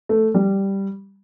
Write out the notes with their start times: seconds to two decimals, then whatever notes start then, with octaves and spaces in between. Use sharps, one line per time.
0.09 A3
0.34 G3